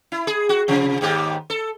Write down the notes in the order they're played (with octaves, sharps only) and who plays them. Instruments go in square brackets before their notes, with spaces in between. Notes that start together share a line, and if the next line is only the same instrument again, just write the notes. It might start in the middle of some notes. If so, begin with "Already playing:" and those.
[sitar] E4
G#4
F#4
C3 F3
D#2 G#2 G4
A4